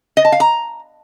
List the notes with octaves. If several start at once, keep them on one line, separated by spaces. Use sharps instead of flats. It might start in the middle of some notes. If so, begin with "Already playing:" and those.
D#5
A5
F5
A#5